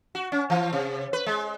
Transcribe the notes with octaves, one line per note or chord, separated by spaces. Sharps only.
F#4
C#4
E3
C3
B4
G#3